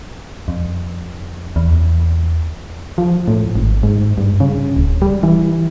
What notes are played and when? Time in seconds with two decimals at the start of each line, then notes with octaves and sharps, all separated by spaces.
0.48 F2
1.56 E2
2.98 F3
3.28 A2
3.55 G#1
3.83 G#2
4.18 G2
4.40 C#3
4.76 D1
5.02 G3
5.23 E3